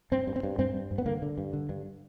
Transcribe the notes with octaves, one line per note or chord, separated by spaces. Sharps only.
G2 C4
G2
C4
G2
G2 C4
G2
G2
B3
D3 A#3
D3
G2
D3
G2